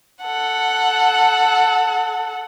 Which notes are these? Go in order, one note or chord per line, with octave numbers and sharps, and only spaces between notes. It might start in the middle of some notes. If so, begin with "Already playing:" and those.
A4 F#5